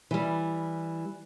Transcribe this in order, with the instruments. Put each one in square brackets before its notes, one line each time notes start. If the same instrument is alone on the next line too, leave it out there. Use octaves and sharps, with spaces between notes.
[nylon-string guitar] E3 G3